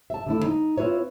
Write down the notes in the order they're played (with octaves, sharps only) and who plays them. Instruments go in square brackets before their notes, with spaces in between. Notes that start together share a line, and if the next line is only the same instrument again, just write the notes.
[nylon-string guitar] E5 A5
D3 A3 E4
D#4
C4 E4 F4 B4 C#5